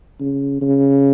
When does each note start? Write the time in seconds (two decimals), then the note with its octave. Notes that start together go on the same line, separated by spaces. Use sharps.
0.20 C#3
0.61 C#3